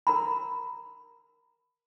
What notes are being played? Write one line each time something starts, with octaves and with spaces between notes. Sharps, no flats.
A#4 A#5 B5